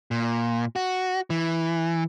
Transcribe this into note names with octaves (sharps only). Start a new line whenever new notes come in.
A#2
F#4
E3